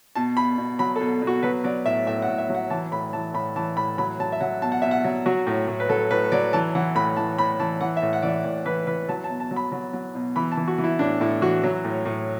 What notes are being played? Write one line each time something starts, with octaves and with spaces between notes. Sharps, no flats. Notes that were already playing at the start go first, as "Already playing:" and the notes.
B2 A5
B2 B5
B2
F#3 B5
A4
B2
B2
F#4
F#3 B4
F#3 D5
A2 E5
A2 E5
F#5
A2
E5
F#3
F#5
E3 A5
A2 B5
E3 A5
A2 B5
E3 A5
A2 B5
F#3 B5
F#3 A5
E5
F#3 F#5
B2 A5
F#5
B2 E5
F#5
F#3
F#3 F#4
A2
A2
B4
F#3 A4
A2 B4
F#3 D5
E3 A5
E3 F#5
A2 B5
E3 A5
A2 B5
E3 A5
E3 F#5
E5
A2
F#5
E3 D5
E5
A2 D5
E3 B4
E3 B4
F#3 A5
A5
B2
A5
F#3
B5
F#3
F#3
B2
E3 B5
A5
E3
F#4
E3
E4
A2 D4
A2 E4
E3 F#4
F#3
A2
A2